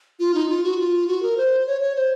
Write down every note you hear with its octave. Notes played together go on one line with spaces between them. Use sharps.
F4
D#4
F4
F#4
F4
F#4
A#4
C5
C#5
C#5
C5